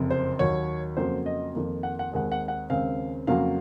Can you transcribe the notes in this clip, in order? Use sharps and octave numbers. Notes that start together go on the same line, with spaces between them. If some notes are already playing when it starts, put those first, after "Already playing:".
Already playing: F#1 F2 C3
C5
D#2 D#3 F#3 C#5
F2 C#3 F#3 A#3 C5
D#5
F2 D#3 A#3
F#5
F#5
D#2 D#3 G#3 C4 F#5
F#5
F#5
D#2 C#3 G#3 C4 F5
F2 C#3 F#3 A#3 F5